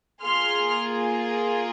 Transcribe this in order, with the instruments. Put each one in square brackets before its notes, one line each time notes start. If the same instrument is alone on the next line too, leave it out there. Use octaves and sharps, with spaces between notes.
[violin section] A#3 F4 G#4 C6 F6